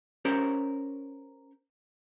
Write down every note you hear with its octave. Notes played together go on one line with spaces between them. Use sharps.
C#4 G4 A#4 C5 C#5